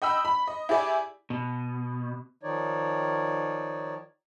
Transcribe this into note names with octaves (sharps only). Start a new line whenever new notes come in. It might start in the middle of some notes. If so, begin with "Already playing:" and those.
D#5 G5 B5 E6
B5
D#5
E4 G4 G#4 D5
B2
D#3 F3 D#4 C#5 D5